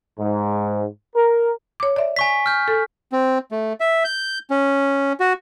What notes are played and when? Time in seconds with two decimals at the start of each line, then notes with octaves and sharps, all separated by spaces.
0.19 G#2
1.15 A#4
1.80 C#5 D6
1.96 D5 E5
2.16 G#5 C#6 B6
2.46 F6 G6
2.68 A4
3.12 C4
3.51 A3
3.80 E5
4.04 G6
4.50 C#4
5.20 F#4